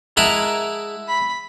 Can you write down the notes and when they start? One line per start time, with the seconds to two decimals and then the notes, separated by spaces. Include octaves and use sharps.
0.17 G#3 E4 A#4 F#5 A5
1.08 B5